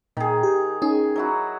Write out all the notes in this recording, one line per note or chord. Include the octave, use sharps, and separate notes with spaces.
A#2 D#3 G#4
G4
C#4 D#4 G#4
F#3 E4 F#4